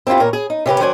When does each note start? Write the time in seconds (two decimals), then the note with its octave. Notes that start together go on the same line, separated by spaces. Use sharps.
0.07 C4 D4 E4 F4 G4
0.20 A#2 A#4 C#5
0.33 G#4
0.50 D#4
0.66 C3 C#4 G4 B4
0.80 D#3 F#3 C5 D5 G#5